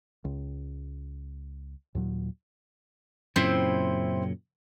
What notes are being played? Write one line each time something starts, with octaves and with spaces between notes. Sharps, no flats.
C#2
D#2 A#2 F#3
F#2 A#2 C#3 C4 E4 C5